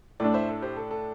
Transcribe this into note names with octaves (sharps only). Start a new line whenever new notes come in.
A2 A3 D4 A4 D5
C5 E5
A4
G4 C5
A4
A4